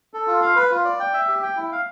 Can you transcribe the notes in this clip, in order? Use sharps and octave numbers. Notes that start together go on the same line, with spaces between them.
A4
F4
F5
B4
F4
D5
G5
E5
G4
G5
E4
F5